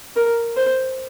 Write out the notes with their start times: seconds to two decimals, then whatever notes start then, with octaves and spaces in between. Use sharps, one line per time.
0.16 A#4
0.57 C5